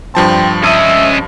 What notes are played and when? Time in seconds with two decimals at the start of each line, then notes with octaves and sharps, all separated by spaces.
0.15 G2 F3 C4 A5
0.63 C#4 D#5 E5